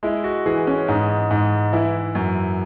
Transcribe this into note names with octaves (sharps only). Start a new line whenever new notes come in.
G#3 E4
F#4
E3 G#4
C#4
G#2 D#4
G#2
E3 E4
F#2